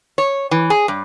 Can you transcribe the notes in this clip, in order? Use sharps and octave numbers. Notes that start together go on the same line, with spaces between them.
C#5
E3
G#4
G2